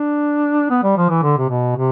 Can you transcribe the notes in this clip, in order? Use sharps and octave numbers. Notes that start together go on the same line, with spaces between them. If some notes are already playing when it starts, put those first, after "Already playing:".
Already playing: D4
B3
G3
F3
E3
D3
C3
B2
C3